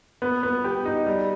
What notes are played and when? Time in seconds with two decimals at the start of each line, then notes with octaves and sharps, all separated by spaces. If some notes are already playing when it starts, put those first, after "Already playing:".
0.22 B3
0.43 B3
0.64 G4
0.85 D#4
1.06 G3